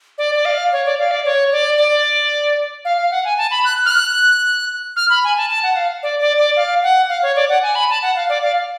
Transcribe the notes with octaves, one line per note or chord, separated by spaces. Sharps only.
D5
D5
F5
C#5
D5
F5
D5
C#5
D5
D5
F5
F5
F#5
G#5
A5
B5
F#6
F6
F#6
F6
B5
G#5
A5
A5
F#5
F5
D5
D5
D5
F5
F#5
F5
C#5
D5
F#5
G#5
B5
A5
F#5
F5
D5
F5